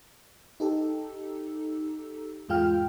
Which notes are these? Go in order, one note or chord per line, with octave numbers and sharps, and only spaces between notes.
D#4 G4 A4
E2 G#2 G#3 F4 G5 F6